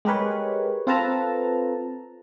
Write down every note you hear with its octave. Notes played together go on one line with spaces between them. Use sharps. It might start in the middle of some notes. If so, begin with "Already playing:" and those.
G#3 G4 A#4 B4 C#5
C4 F4 A4 B4 A5 A#5